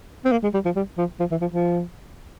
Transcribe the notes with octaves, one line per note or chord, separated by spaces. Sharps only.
C4
A#3
G#3
G3
F3
G3
F3
F3
E3
F3
F3